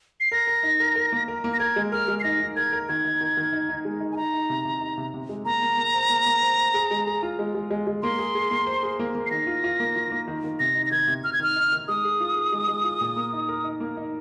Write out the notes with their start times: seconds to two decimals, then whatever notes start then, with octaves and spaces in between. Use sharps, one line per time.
0.20 C7
0.32 A#4 A#6
0.47 A#4
0.63 D#4
0.80 A#4
0.96 A#4
1.12 A#3
1.28 A#4
1.44 A#3
1.54 A#6
1.60 A#4 G#6
1.76 G#3
1.92 A#4 F6
2.08 G#3
2.20 C7
2.24 D#4 A#6
2.40 D#4
2.56 A#4 G#6
2.73 A#4
2.88 D#3 G#6
3.05 D#3
3.21 D#3
3.37 D#3
3.53 D#4
3.69 D#4
3.85 G#3
4.01 D#4
4.12 G#5
4.17 D#4 A#5
4.34 D#4
4.50 C3
4.65 C3
4.81 D#4
4.98 C3
5.14 C3
5.29 G#3
5.45 A#3 A#5
5.62 A#3
5.77 A#3
5.94 C5
6.09 A#3
6.26 A#3
6.42 C5
6.58 C5
6.74 G#4
6.91 G#3
7.07 G#4
7.23 F4
7.39 G#3
7.55 G#3
7.71 G#3
7.87 G#3
8.02 A#3 C6
8.19 G#4
8.35 G#4
8.51 A#3
8.67 C5
8.83 G#4
8.99 A#3
9.15 A#3
9.26 C7
9.31 D#3 A#6
9.47 F4
9.64 F4
9.80 A#3
9.96 F4
10.11 A#3
10.28 D#3
10.44 D#3
10.59 C3 A#6
10.75 D#4
10.86 A#6
10.91 D#3 G#6
11.07 C3
11.24 C3 F6
11.33 G#6
11.40 D#3 F6
11.56 D#4
11.72 D#3
11.88 G#3 D#6
12.04 G#4
12.20 F4
12.36 G#4
12.52 G#3
12.68 G#3
12.84 F4
13.01 A#2
13.16 A#3
13.33 D#4
13.49 A#4
13.64 D#4
13.80 A#3
13.97 D#4